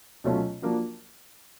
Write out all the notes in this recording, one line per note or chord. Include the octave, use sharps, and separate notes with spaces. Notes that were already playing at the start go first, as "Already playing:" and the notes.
B2 F#3 A3 C#4 F4
F3 A#3 D4 F#4